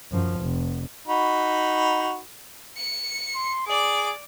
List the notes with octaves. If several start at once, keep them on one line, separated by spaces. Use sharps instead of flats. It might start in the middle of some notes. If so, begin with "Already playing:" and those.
F#2 F3
F1
D#4 F#4 B5
C#7
C6
G#4 D5 D6